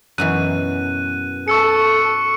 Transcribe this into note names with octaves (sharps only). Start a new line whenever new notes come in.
F#2 B2 E3 F#6 D#7
A4 C#6 E6 C#7